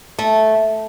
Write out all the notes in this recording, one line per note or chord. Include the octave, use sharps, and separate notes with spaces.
A3